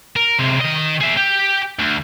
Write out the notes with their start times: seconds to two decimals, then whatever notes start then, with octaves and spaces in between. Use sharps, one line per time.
0.16 A#4
0.39 C3 G#3
0.60 D#3 D#5
1.01 G#4 E5
1.17 G4
1.79 D2